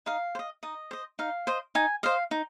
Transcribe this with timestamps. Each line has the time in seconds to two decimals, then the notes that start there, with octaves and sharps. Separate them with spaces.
0.06 D#4 F5
0.35 C5
0.39 D#5
0.63 D#4 D#5
0.91 C5 D#5
1.19 D#4 F5
1.47 C5 D#5
1.75 D#4 G#5
2.03 C5 D#5 F5
2.31 D#4